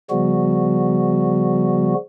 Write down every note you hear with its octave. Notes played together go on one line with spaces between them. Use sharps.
C#3 F3 G3 B3 F#4